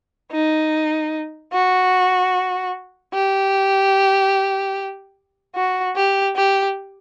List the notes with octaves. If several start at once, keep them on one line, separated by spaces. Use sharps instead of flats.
D#4
F#4
G4
F#4
G4
G4